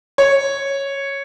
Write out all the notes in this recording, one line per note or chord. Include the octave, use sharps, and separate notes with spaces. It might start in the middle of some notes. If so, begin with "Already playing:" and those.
C#5